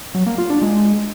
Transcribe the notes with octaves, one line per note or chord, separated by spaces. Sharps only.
F#3
A#3
F4
D4
G#3